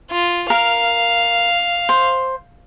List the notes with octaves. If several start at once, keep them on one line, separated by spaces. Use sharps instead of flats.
F4
A#4 F5
C5